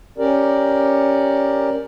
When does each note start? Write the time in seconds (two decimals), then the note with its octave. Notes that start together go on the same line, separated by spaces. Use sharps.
0.18 C#4 G4 A#4 D5